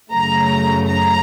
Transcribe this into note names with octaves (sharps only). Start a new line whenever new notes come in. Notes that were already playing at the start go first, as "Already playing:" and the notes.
F#2 C#3 F#3 A3 A#5
A#5